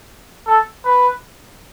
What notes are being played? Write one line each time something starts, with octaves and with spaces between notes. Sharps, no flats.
A4
B4